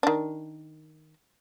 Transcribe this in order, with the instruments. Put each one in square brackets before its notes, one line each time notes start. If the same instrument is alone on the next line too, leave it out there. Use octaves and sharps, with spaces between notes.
[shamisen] D#3 D4